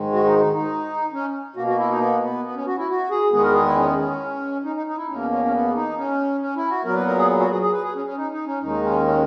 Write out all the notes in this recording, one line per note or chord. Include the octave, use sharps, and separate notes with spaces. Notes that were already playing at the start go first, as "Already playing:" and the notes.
Already playing: G#2 D#3 G#3
F#4
D#4
D#4
D#4
C#4
B2 A#3 F#4
F#4
E4
D#4
B3
B3
B3
C#4
F#4
E4
F#4
G#4
E2 D#3 G#3 B3 G#4
A#4
G#4
E4
C#4
C#4
D#4
D#4
D#4
E4
E2 B2 A#3 C#4
C#4
C#4
B3
D#4
C#4
C#4
E4
F#4
A#2 F#3 B3 A#4
B4
A#4
G#4
F#4
G#4
G#4
B4
G#4
C#4
C#4
D#4
D#4
C#4
D#2 D#3 G#3 D#4
C#4
C#4